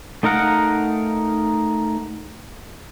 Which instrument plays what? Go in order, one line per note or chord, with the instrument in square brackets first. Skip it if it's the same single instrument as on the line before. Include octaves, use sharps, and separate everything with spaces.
[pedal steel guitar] A3 D#4 A#4 F5 F#5